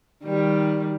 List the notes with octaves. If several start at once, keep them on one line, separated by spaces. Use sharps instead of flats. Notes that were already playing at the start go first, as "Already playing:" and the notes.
D#3 G3